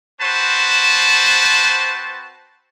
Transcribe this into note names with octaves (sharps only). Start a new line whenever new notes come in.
C4 F#4 B4 C5 A5